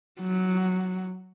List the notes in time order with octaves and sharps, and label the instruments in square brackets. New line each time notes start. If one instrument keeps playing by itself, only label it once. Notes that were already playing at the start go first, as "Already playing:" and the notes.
[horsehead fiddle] F#3